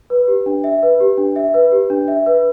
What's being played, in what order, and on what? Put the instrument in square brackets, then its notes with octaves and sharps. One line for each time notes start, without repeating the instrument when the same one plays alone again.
[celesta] B4
G4
D4
E5
B4
G4
D4
E5
B4
G4
D4
E5
B4